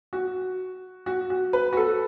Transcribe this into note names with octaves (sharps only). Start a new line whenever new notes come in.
F#4
F#4
F#4
B4
F#4
A4